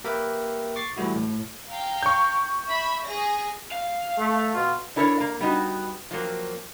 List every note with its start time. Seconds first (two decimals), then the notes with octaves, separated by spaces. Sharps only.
0.04 A#3 G4 A#4 B4 E5 G5
0.76 C#6 D6 A6 C7
0.97 E3 G3 A3 E4 F#4
1.16 A2
1.69 F5 G5 A#5
2.03 C#6 G6
2.68 E5 B5
3.04 G#4 A#6
3.71 F5
4.18 A3
4.54 B2 F4
4.96 D4 E4 A4 A#4 C5 C#5
5.20 A#3
5.41 G3 B3 D#4 F#4
6.11 F3 F#3 A#3 C4